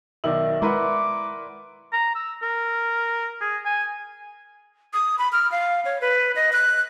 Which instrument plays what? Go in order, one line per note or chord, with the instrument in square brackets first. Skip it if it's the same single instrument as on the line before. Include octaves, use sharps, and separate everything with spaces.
[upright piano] B1 D#3 F#7 [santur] D5 E5
[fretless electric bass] G#3 [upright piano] E4 A#4 B4 [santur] F#5 B5 C6 [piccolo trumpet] D6
[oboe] A#5
E6
A#4
G#4
G#5
[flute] D#6
B5
F6
F5
C#5
B4
D#5
F#6